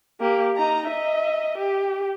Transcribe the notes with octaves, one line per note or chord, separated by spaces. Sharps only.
A#3 G4
D#4 A#5
D#5 E5
G4